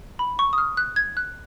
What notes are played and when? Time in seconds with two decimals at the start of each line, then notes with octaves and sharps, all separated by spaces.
0.19 B5
0.39 C#6
0.53 D#6
0.58 F6
0.77 F#6
0.96 G#6
1.17 F#6